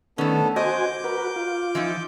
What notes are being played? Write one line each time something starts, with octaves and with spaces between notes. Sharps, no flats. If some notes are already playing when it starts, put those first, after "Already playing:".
D#3 A3 B3 C#4 D4 A4
F#4 C5 D#5 G#5 D6 G6
F#4 A#4 B4
F4
E3 F3 D#4